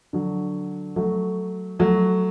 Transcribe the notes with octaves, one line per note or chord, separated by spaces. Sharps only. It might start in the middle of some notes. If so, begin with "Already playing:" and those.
D3 F#3
F#3 A3
F#3 A3